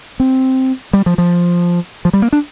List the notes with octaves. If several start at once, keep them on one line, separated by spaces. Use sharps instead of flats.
C4
G3
F3
F3
F3
G3
A#3
D4